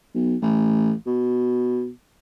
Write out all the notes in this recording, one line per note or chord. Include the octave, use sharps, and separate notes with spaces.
B1
A1
B2